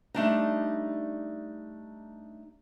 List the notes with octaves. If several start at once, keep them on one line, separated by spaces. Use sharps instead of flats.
G3 A3 D4 D#4